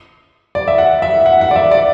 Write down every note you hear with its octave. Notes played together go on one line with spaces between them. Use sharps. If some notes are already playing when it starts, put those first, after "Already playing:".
D5
E5
F#5
E5
F#5
F#5
D5
E5
D5